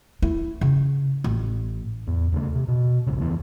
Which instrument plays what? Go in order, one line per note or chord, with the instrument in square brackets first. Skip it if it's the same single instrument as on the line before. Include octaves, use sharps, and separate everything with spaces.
[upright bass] E4
C#3
A1
[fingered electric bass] E2
D#2 C#3 A3
C3
B2
A1 D2 C#3
F1 D#2 E3 B3